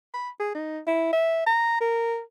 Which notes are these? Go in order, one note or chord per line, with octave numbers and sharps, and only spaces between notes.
B5
G#4
D#4
E4
E5
A#5
A#4